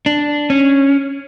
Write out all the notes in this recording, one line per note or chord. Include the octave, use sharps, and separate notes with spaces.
D4
C#4